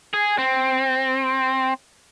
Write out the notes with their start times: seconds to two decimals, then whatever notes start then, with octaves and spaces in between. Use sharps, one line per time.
0.14 G#4
0.38 C4